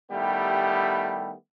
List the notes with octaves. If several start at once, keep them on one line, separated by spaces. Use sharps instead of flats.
D#3 G3 A3 B3 E4 G4